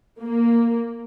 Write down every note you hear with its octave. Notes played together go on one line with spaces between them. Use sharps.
A#3